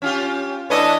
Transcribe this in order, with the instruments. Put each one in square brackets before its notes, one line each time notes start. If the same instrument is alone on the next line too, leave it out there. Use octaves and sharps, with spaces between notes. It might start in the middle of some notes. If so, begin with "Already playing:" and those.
[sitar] C#4 F4 G4
[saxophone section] E3 D4 D#5 [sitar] A3 B4 C#5